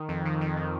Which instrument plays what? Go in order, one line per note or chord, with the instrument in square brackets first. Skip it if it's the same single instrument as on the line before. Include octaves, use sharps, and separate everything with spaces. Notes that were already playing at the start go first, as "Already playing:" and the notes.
Already playing: [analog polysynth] D#3
F2
D#3
F2
D#3